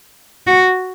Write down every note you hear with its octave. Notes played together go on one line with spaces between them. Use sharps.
F#4